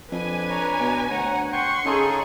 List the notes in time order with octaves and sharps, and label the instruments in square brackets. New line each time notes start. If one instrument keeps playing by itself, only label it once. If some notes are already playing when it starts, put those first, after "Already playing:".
[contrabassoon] F2 [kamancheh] D4 B4 [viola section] G#5
[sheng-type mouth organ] C#5 A#5
[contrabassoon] B2
[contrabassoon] D2 [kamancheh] C#5 F#5 [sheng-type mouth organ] A#5
[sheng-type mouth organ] F#5 G5 [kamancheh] C6 C#6
[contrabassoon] C#3 [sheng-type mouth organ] C#4 D#4 A4 [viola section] G#4